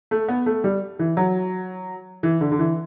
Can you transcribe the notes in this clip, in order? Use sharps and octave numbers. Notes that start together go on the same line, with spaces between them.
A3
B3
A3
G3
E3
F#3
E3
D3
D3
E3